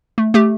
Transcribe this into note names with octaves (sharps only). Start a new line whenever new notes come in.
A3
A3 G4